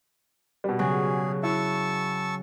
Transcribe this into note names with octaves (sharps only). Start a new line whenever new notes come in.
B2 G3
C#3 F#3 G#4
E4 A5 C#6 E6